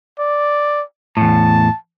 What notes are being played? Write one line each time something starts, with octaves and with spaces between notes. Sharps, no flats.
D5
E2 A2 A5